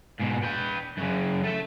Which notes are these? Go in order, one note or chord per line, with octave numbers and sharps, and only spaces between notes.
G#2 B2
B4 G5
F#2 C#3
A3 E5